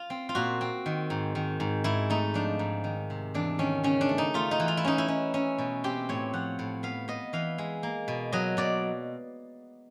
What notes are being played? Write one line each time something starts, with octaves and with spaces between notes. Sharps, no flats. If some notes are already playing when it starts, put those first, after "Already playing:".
Already playing: F4
C4
F4
A#2 F#4
C4
D#3
G#2
D#3
G#2
G#2 E4
A3 D#4
F3 D4
G#2
D#3
C3
E2 D4
D#3 C#4
C#3 C#4
D4
A3
D#4
A3 F4
D#4
E3
F4
E4
C#4 D#4
E4
C#4
C#4
B2
C4 G4
A2 C#5
F3 F#5
A2
B3 F5
B3 D#5
E3 F5
G#3
A#3
B2
F#3 D#5
B2 D5